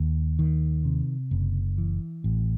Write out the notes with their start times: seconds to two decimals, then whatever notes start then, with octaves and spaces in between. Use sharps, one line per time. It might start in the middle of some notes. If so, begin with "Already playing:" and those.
Already playing: D#2
0.39 D#3
0.85 C3
1.31 F#1
1.78 E3
2.24 A1